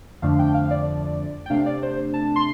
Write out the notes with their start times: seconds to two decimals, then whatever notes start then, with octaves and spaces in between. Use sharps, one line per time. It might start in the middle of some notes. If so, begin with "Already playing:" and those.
0.22 F2 D3 F3 A3 D4 F5
0.39 G5
0.54 F5
0.71 D5
1.46 G5
1.50 C3 A3 D4 F5
1.66 D5
1.83 C5
2.14 A5
2.36 C6